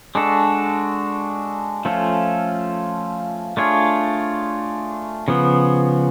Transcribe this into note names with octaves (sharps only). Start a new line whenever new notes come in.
G#3 D4 F#4 A4
F3 A3 C#4 F4 A4
A3 D4 F4 G#4 C#5
C#3 F3 B3